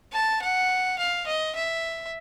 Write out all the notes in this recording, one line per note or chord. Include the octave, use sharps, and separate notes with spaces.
A5
F#5
F5
D#5
E5